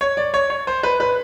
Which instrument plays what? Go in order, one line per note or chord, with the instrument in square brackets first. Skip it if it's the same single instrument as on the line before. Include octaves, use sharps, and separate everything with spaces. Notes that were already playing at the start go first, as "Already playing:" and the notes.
[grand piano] C#5
D5
C#5
C#5
C5
B4
B4